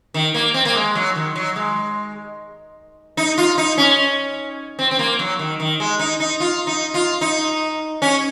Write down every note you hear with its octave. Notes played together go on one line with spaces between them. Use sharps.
D#3
A#3
C4
A#3
G#3
F#3
D#3
F#3
G#3
D#4
F4
D#4
C#4
C4
C4
A#3
F#3
D#3
D#3
G#3
D#4
D#4
F4
D#4
F4
D#4
C#4